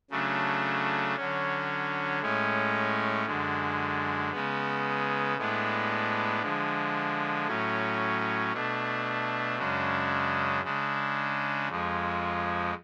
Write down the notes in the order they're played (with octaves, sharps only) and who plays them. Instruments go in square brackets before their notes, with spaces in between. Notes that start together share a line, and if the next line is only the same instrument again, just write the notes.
[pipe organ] C#3 F#3 A3 D4
D3 F#3 C#4
A2 G#3 C#4
F#2 D3 G#3
C#3 G#3 B3
A2 G#3 B3 D4
D3 F3 G#3
A2 F#3 C#4
B2 A3 D4
F#2 C#3 G#3 D4
C#3 G#3 D4
F2 F3 G#3